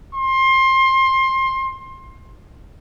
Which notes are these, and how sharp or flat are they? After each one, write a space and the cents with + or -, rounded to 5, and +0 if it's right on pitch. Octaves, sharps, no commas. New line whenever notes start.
C6 +25